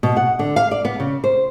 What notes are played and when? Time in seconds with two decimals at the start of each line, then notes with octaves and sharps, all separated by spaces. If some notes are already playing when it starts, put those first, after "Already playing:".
0.03 B2
0.17 F#5
0.39 D3
0.56 F5
0.71 D5
0.85 B3
1.00 C#3
1.24 C5